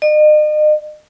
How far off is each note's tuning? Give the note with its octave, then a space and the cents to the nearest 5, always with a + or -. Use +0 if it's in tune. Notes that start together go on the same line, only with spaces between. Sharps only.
D#5 -40